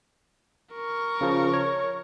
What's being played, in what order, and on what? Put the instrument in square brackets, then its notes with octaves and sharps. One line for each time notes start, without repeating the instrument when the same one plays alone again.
[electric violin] A#4 C#6
[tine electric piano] C#3 F3
C#5